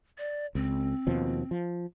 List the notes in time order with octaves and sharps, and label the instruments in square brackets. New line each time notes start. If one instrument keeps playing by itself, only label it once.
[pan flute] D5
[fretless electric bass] C#2 [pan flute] C4
[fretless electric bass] D#2 B2 F3
F3